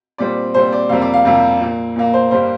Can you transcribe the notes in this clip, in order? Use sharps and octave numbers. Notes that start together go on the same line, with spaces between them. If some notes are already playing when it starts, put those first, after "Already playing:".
A#2 G3 C4 D5
A#2 G3 C4 C5
D5
F2 C3 G3 A#3 F5
D5
F5
F2 C3 G3 A#3
A#2 A#3
A#2 A#3
C5
G2 G3 A#3 C5